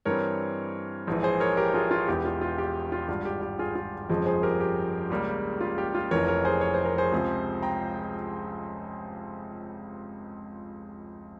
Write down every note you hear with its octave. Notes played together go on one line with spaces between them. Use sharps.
G2 E3 G3 C4 A#4 C#5
A#1 G#2 E3
G#4 C5
A#4 C#5
G4 A#4
F4 G#4
F4
E1 E2 E3 G4
F4
F4
G4
F4
G#1 G2 G3 F4
G4
G4
F4 G#4
F4 G#4
G1 F2 C#3 F3 G#3
G#4 C5
G4 A#4
G4
C#2 C#3 G3 A#3
F4
G4
F4
F1 F2 E3 A#4 C#5
A#4 C#5
G#4 C5
C#5
C5
A#4
G#4 C5
C#2 C3 F3
G5 A#5